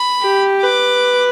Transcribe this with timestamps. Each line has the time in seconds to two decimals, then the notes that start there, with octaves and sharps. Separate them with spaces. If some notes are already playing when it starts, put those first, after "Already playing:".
Already playing: B5
0.22 G4
0.63 B4 D6